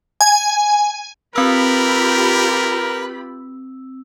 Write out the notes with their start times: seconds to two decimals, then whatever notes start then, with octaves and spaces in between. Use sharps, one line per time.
0.21 G#5
1.36 C4 F4 G4 A#4 B4 B5 E6